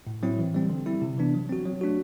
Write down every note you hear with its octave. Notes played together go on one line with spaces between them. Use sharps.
A2
F#3 C4 E4
E3
G3 C4
D3
G3 C4 E4
C3
E3 B3 D4
F#3
C4 F#4
F#3
A3 D4 F#4